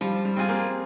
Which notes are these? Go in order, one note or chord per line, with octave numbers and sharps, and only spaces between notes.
F3 G3
G3
C4 F4 G#4
A#3